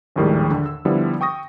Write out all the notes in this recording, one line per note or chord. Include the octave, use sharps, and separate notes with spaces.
A#1 D#2 A2 D#3 G3 G#3
D3
E6
D3 F3 G3 B3 E4
G5 C#6 D#6 A#6